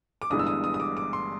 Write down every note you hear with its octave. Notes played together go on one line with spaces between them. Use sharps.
D6
G1 G2 E3 G#3 B3 D#6
E6
D#6
D#6
D#6
D6
D6
C6